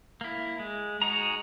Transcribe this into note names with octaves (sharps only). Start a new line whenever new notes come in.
A#3 E4
G#3
G#3 D#4 F#4 G#4 A#5